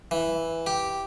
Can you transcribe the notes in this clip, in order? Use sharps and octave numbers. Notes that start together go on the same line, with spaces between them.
E3
G4